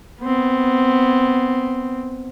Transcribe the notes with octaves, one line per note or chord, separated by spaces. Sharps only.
B3 C4